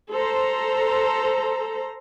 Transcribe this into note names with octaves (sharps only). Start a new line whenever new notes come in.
A4 C5 A#5